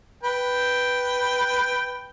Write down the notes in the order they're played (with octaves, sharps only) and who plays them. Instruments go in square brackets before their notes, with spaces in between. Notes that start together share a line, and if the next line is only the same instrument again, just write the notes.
[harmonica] B4 G5